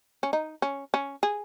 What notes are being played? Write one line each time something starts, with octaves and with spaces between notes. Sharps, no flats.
C#4
D#4
C#4
C#4
G#4